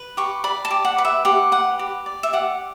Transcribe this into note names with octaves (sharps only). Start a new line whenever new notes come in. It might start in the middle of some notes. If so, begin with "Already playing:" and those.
Already playing: B4
G4 C#6
D5 B5
A5
G4
F#5
B4
E5
G4 F#5
B4 F#5
G4
D5
E5
G4 F#5